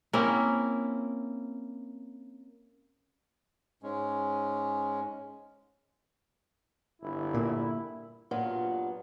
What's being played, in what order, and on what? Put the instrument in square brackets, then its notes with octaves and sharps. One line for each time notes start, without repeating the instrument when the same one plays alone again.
[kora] A#3 C4 C#4 E4
[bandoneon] G#2 G#3 C#4
[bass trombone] G1 [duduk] E4
[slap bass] A#2
[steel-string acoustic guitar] G2 A#2 F#3 B3 F4